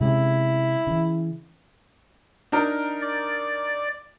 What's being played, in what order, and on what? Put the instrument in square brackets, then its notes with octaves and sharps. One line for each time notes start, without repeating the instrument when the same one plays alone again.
[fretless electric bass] C3 G#3 C#4 [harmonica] E4
[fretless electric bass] C#3 E3
[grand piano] D4 D#4 A#4
[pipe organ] D5